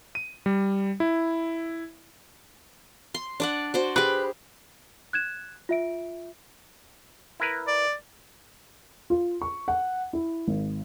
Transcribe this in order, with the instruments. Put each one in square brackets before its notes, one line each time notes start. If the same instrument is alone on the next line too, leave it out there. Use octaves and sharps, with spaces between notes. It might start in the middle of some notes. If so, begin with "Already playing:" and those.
[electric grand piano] D#7
G3
E4
[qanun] C6
D4 D5 F#5
F#4 C5 D5
[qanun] G4 G#4 [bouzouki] B4
[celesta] F#6 G#6 E7
F4 E5 D7
[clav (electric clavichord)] E4 A#4 B4
[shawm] D5
[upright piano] F4
C#6
F#5
E4
G#1